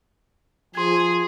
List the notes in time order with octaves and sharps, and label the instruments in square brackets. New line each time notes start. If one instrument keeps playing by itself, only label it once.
[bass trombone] F3 [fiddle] G#4 [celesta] C6 G#6